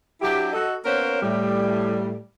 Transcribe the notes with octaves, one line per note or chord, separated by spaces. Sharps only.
F#3 D4 E4 G4
F#4 A4 D#5
A#3 B3 C#4 A#4 C5 C#5
A2 G3